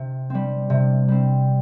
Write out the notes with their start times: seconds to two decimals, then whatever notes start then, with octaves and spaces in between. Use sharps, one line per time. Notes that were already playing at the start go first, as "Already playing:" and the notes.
Already playing: C3
0.30 G3 C4
0.70 C3
1.08 G3 C4